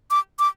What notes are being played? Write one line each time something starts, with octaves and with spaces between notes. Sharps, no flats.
D6
D6